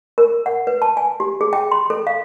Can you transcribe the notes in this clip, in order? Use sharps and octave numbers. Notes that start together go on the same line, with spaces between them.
A#4
F#5
B4
A5
G#5
G4
G#4
G5
C6
A4
F5